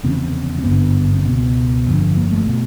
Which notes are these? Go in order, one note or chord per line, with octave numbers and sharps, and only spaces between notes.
F1 E2 C#3 C4
C4
G#1 G2 D3 B3
C4
C#2 B2 B3
G1 F2 D3
A#3
A3
B2